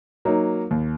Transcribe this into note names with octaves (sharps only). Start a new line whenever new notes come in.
F#3 A#3 D#4
D#2